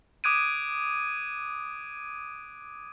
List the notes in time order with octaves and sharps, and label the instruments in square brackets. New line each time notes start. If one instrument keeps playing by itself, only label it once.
[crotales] D6 D#6 F#6 G#6 D7 D#7